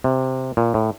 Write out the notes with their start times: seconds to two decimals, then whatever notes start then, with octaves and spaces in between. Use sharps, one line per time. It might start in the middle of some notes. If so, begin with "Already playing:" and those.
0.04 C3
0.57 A#2
0.74 A2